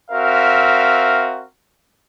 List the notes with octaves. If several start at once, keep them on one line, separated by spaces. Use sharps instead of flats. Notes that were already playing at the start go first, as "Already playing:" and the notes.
C4 F#4 A#4 E5 F5